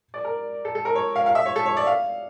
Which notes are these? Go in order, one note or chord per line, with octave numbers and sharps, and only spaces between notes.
D5
A#4
A4
A4
A#4
C#5
F5
F5
E5
C#5
A4
C#5
D5
F5